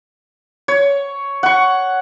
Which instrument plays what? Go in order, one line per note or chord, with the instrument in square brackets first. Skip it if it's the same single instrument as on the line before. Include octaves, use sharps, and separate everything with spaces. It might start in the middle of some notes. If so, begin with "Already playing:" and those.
[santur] C#5
F#5 C#6